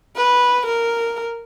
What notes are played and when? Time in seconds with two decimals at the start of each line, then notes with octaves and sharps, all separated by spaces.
0.16 B4
0.66 A#4